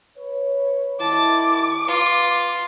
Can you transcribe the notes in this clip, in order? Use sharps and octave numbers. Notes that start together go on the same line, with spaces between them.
B4 C#5
D#3 E4 A5 D6
F4 B4